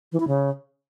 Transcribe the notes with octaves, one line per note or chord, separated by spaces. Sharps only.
E3
E4
C#3